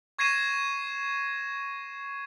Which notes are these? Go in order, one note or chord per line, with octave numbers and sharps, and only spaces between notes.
C#6 G#6 A#6 C7 D#7 E7